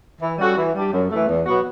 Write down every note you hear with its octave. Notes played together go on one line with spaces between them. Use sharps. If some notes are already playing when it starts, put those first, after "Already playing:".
E3
G3 C#4 F#4 A4
E3
G3 D4 G4
F#2
E3 A3
E2
B2 F#3 B3 F#4